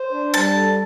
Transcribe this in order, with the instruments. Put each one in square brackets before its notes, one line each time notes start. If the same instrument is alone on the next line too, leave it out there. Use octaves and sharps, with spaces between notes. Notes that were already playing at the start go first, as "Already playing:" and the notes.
Already playing: [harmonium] C5
D4
[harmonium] G3 [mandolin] A5
[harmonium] A4